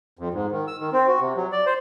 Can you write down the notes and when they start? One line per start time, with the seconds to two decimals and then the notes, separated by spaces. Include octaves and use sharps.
0.19 F2
0.34 G#2
0.51 D#3
0.67 E6
0.80 D#3
0.93 C4
1.07 F#4
1.20 C3
1.36 F#3
1.52 D5
1.66 C5